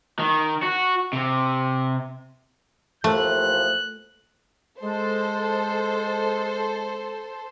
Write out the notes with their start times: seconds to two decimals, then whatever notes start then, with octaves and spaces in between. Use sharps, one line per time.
0.19 D#3
0.63 F#4
1.13 C3
3.04 D#2 E3 F3 A3 F#6
4.81 G#3 A4 C5